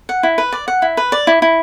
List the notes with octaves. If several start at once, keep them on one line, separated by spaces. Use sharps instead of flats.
F#5
E4
B4
D5
F#5
E4
B4
D5
E4
E4